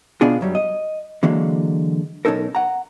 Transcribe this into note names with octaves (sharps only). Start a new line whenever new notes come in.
B2 B3 D4 F4 G#4
F#2 F#3 G3
D#5
D3 E3 F#3 G#3 A#3
B1 C#4 D#4 A4 A#4
F#5 A#5